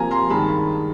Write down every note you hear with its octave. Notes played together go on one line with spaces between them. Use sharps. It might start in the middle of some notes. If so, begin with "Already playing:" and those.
Already playing: C3 F3 A#3 G#5 A#5
A#5 C6
G2 D#3 G#3 A5 B5